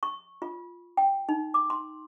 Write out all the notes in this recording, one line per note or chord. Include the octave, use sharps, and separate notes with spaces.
C#6
F4
G5
D#4
D6
C6